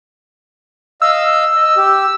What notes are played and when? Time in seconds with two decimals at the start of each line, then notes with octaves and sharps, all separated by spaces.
1.02 D#5 F5 E6
1.56 D#5
1.77 G4